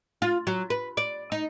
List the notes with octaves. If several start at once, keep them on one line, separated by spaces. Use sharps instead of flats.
F4
F#3
B4
D5
D#4